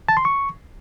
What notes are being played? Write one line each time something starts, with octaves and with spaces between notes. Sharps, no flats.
A5
C6
C#6